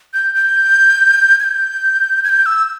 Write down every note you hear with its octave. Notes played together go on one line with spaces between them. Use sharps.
G6
G6
G#6
G6
G#6
G6
E6